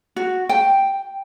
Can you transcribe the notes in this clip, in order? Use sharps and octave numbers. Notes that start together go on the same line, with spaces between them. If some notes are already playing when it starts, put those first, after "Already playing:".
F#4
G5